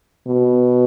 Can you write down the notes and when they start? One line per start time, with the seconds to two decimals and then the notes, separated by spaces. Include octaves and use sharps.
0.27 B2